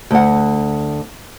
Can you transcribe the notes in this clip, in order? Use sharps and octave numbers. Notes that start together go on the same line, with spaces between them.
D2 F#5